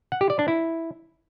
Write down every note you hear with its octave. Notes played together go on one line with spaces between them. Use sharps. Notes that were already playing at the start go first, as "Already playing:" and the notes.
F#5
G4
D5
D4
E4